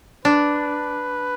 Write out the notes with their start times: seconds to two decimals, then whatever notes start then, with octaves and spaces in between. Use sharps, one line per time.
0.25 D4 B4